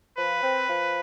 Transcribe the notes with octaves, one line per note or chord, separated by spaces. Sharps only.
F3 B4
C4
F3